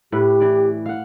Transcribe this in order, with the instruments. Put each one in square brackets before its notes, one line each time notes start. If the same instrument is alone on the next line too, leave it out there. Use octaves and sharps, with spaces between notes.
[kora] A2 B4 [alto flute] G4
[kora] E3 D5
F5 F#5